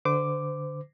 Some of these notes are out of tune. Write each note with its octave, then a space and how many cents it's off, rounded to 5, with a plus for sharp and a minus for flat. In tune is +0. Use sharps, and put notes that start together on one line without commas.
D3 +0 C5 -35 D6 +0